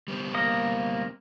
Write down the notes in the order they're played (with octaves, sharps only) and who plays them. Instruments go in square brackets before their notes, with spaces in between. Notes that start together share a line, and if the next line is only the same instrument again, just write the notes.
[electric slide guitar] G3 B3 C4
[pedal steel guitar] A#3 D#5